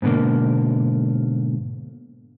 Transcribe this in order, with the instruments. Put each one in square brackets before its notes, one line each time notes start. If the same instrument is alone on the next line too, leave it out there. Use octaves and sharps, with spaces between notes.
[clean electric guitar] G#2 B2 D3 A#3